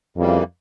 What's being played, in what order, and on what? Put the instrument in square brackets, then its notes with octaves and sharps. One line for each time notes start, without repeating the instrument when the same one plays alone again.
[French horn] F2 [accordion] C#3 E3 G3 A#3